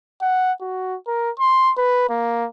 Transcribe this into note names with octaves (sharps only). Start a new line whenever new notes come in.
F#5
F#4
A#4
C6
B4
A#3